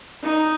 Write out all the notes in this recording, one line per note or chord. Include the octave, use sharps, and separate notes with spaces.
D#4